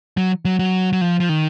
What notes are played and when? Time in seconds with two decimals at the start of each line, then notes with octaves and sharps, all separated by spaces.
0.17 F#3
0.45 F#3
0.59 F#3
0.93 F#3
1.01 F3
1.20 F3
1.29 D#3